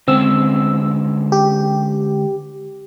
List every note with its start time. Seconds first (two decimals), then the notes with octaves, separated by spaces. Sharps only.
0.08 D3 G#3 C4 C#4 E6
1.32 G4